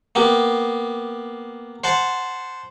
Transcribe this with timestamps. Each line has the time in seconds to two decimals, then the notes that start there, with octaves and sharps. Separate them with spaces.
0.15 A#3 B3 G4
1.84 C5 F#5 A5